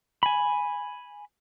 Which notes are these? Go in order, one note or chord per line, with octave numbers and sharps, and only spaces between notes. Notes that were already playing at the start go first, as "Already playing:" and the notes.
G#5 B5